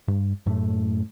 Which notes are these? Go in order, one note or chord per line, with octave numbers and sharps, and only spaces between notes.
G2
F#2 A2 A3